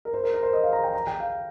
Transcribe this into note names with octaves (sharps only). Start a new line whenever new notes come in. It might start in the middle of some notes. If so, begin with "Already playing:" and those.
A#4
C5
A#4
A#4
C5
D#5
F5
A#5
G5
A#5
G5
F5